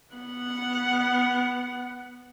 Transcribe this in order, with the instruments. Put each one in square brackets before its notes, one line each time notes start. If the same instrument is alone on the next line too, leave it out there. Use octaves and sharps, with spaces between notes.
[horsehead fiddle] B3 F#5